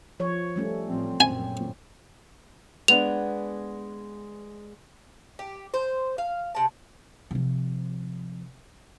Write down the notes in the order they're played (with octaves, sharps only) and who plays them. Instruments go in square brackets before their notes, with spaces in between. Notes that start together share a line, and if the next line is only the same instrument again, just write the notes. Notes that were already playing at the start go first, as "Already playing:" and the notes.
[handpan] F3 C#5
G3 A3 C#4
[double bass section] A1 F3 C4
[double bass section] A#1 F#2 [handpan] C4 [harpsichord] G#5
[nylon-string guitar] G#3 B3 D4 [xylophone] F7
[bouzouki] G4
C5
F5
C3 A5
[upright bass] C3 F3